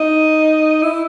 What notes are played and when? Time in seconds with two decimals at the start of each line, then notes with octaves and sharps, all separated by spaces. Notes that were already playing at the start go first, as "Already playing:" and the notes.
Already playing: D#4
0.83 E4